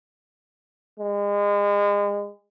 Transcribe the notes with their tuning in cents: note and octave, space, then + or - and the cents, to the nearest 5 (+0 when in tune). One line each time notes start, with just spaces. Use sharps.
G#3 -35